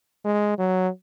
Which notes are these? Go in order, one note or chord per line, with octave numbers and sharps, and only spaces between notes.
G#3
F#3